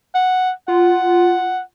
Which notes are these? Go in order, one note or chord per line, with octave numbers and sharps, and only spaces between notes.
F#5
F4 F#5